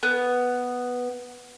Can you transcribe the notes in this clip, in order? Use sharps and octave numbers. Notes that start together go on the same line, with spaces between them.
B3